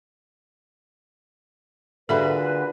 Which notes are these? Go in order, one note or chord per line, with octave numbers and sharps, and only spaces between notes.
A#2 D3 F#4 G#4 A4 B4 E5 B5